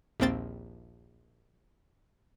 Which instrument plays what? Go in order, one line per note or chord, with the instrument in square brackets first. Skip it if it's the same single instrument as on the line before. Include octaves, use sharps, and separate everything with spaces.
[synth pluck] A#1 D#2 A#3 C4 G5 A6